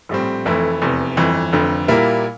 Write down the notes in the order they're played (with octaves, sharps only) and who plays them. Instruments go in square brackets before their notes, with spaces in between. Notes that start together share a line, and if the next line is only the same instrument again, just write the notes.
[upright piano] A#1 A2 G3 C4
F1 F2 E3 A3 E4
F1 E2 C3
G1 F2 E3
F1 F2 D3
A#2 G3 A#3 E4 A#4